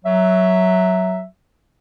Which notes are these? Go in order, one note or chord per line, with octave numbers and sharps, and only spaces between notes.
F#3 E5